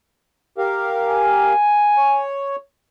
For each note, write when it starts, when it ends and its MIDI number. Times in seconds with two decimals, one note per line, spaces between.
0.58 1.53 67
0.58 1.53 70
0.58 1.53 77
1.08 2.23 80
1.97 2.56 73